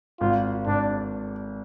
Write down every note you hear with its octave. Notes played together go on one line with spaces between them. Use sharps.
G#1 F4
G#1 D4